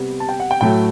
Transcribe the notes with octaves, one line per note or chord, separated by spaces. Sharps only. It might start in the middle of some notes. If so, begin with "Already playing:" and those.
Already playing: C3 G3 B3
A5
G5
F#5
G5
A2 F#3 A3 G5